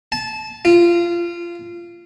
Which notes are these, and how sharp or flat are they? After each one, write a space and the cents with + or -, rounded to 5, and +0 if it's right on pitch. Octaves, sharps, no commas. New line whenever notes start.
A5 -20
F4 -20